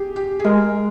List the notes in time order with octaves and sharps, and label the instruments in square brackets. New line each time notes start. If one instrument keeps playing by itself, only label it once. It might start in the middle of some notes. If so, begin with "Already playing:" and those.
Already playing: [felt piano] G4 G#4
G4
G#4
[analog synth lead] G#3 [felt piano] A#4